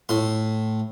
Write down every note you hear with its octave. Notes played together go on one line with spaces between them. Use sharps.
A2 C6